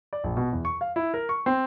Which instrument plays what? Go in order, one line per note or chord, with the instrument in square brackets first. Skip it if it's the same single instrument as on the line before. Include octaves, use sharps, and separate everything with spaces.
[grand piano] D5
A#1
B2
E2
C#6
F5
E4
A#4
C#6
C4